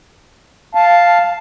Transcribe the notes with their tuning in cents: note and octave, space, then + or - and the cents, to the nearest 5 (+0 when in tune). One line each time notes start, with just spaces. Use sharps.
F5 +0 A5 +0